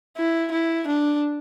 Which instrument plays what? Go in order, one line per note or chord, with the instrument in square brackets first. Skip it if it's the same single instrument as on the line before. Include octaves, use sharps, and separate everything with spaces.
[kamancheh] E4
E4
D4